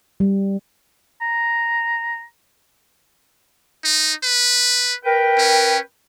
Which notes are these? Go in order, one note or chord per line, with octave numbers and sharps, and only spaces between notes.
G3
A#5
D#4
B4
A#4 B4 G5
C#4